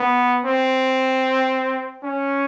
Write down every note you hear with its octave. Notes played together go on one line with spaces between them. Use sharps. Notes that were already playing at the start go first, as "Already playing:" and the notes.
Already playing: B3
C4
C#4